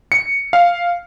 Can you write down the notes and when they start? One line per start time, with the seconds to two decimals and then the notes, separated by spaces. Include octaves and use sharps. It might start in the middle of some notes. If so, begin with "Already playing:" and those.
0.12 C#7
0.53 F5